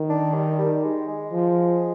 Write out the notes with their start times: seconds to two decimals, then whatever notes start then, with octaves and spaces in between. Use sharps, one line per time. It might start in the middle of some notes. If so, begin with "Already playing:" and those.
Already playing: D#3
0.10 D4
0.34 G3
0.58 G3
0.83 G#3
1.08 G#3
1.32 F3